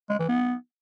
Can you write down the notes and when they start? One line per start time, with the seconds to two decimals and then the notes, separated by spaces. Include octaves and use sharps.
0.10 G#3
0.19 E3
0.28 B3